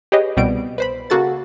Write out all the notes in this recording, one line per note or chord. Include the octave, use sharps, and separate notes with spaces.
G4 G#4 B4 C#5 D#5
C2 B2 G3 D7
B4 C5 B5
C#3 A#3 F#4 A4 A6